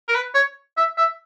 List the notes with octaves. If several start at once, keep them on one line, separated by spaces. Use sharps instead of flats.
A#4
B4
C#5
E5
E5